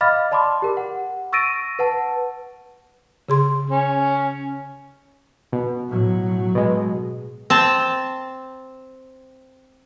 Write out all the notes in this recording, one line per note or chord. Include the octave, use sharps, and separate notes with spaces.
D#5 F5 B5 D6 F6 A6
D5 A5 B5 C6 D6
G4 A#4
F#5
C#6 E6 A6 A#6 D7 D#7
B4 F#5 A5
C#3 G#4 C6
C#4
B2
A2 F#3
B2 G#3
C4 A5